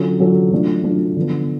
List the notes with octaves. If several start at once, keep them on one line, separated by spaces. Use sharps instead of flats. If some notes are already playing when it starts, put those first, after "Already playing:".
Already playing: D3 F#3 C#4 F4 A4
D3 F#3 C#4 F4 A4
F#3 A3 D4 F4
F#3 A3 D4 F4
D3 F3 B3